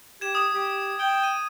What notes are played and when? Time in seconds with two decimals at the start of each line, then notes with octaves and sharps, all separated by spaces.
0.21 G4 G#6 E7
0.35 D#6 E7
0.53 G4
0.99 G5
1.23 D#7